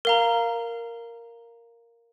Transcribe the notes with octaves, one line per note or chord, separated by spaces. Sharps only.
A#4 F5 A#5